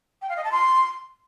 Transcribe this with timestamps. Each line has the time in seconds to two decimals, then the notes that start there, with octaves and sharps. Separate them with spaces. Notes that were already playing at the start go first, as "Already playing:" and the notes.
0.22 G5
0.29 F5
0.37 D#5
0.44 A5
0.52 C6